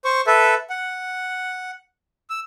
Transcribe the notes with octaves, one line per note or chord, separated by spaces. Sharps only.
C5 C#6
A4 B4 E5
F#5
E6